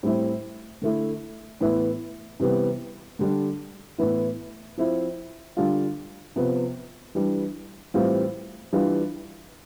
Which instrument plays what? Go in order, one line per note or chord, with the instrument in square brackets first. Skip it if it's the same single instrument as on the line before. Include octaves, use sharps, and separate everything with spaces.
[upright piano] A2 G3 C4 E4
D3 A3 E4
A2 E3 B3 E4
C3 E3 G3 B3
D3 G3 D4
A2 E3 B3 E4
F3 C4 E4
D3 G3 D4 F4
C3 F3 B3
E3 G3 D4
A2 E3 G3 C4 F4
E3 G3 D4 F4